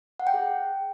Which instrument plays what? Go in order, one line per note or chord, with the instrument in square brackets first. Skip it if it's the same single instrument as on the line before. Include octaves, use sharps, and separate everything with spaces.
[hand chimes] F#5
G5
G#4